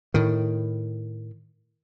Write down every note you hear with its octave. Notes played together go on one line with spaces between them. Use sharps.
A2 D#3